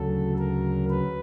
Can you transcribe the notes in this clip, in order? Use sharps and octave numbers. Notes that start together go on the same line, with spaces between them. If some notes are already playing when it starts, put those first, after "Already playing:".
Already playing: D2 C#3 F#3 A4
A#4
B4